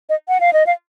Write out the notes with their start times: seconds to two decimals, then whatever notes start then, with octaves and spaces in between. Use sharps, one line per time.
0.09 D#5
0.28 F#5
0.40 F5
0.53 D#5
0.66 F5